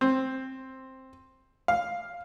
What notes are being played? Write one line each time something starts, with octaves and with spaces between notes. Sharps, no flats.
C4
F5